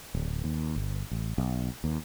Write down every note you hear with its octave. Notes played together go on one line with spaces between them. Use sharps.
D1
D#2
G1
A1
B1
D#2